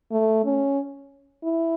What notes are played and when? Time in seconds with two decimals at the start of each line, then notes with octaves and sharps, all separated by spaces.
0.12 A3
0.45 C#4
1.44 E4